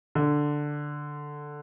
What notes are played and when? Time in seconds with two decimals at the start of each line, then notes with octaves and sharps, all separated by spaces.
0.15 D3